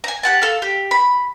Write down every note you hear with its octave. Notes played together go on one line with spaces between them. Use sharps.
G#5 A#5
G4 F#5 A5
A4 F5
G4
B5